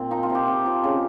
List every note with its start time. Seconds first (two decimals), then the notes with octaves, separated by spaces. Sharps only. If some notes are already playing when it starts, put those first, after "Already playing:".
Already playing: A#2 C4
0.11 F3 D#4
0.23 F4
0.30 C3
0.35 G4
0.47 C3
0.66 F3
0.84 C#3